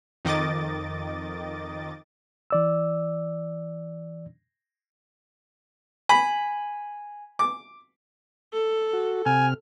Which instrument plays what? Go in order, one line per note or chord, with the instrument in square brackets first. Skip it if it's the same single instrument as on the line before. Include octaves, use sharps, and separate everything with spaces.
[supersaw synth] F2 D#3 D#5 D6 A6
[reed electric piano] E3 D5 E6
[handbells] G#5 [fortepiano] B5
[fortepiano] D6
[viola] A4
[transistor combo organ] F#4
[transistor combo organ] C3 F6 [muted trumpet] G#5